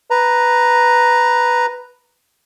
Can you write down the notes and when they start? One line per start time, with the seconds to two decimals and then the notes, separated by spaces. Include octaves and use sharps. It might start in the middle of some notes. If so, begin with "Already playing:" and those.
0.11 B4 A#5